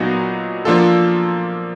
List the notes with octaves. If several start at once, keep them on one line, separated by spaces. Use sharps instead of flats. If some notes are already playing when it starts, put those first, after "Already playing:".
Already playing: A#2 F#3 B3 D#4 F#4
F3 A#3 D4 F4 A4